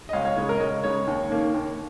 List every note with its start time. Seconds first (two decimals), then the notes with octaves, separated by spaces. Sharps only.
0.09 D#5
0.13 C#2 C#5 F5
0.25 C#5 F5
0.37 C#3 G#3 C#5
0.49 A#4
0.55 D#5
0.60 C#2 C#5
0.84 C#3 G#3 C#5
1.07 D#2
1.30 D#3 A#3 C#4
1.54 D#2